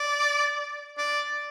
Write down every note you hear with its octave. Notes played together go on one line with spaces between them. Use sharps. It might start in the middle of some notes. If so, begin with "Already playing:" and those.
Already playing: D5
D5